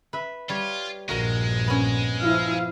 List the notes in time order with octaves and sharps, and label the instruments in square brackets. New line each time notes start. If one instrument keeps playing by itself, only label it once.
[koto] B4 E5
[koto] G3 C#5 [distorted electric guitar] F4
[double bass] A#1 G2 [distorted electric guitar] G#3 [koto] F#4 A#4 A#5
[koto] B3 C#4
[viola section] F3 E4 F5